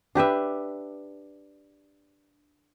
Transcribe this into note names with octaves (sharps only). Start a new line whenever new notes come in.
D4 G4 B4 E5